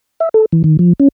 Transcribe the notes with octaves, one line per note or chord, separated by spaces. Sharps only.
E5
A4
E3
D#3
F3
C#4